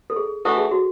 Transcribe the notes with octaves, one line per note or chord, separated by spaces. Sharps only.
A4
G#4
E3 A3 D4 F#4 A4
G#4
F#4